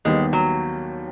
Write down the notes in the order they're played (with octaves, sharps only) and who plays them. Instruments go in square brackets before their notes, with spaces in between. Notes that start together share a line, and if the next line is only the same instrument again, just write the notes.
[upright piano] D#2 D#3 G3 B3 [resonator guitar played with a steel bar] G#3
[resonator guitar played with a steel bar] F#3